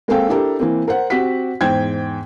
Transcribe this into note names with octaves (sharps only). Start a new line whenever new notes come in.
G#3 A#3 C4 A4 F5 G5
D4 E4 G4 A4 A#4
E3 A#3 C4
A#4 C5 F#5
C4 F#4 G4 F#5 B6
E2 G#2 C5 G5 G#6